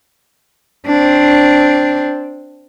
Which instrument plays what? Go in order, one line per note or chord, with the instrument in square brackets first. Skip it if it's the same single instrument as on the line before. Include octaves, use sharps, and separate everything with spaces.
[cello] C4 D4